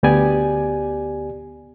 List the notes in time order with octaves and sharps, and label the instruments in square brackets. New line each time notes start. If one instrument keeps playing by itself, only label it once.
[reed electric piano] D2 B3 G4 D5 G#5